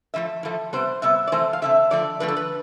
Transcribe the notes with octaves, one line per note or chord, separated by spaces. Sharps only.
A2 F3 A3 E5
A2 F3 A3
C3 G3 B3 C5
C3 G3 B3 E5
D5
C3 E3 A3 C5
F5
C3 E3 A3 E5
D3 F3 A3 D5
D3 F3 A3 B4
A4
B4